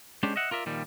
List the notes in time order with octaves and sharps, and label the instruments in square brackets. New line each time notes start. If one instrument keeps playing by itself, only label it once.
[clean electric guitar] G#3 C#4 D4 G4 C5
D#5 E5 F#5
F4 A#4 D5 E5
A#2 D#3 F3 G3